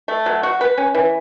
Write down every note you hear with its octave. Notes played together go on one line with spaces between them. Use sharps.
A3
F#3
F#4
B4
C#4
E3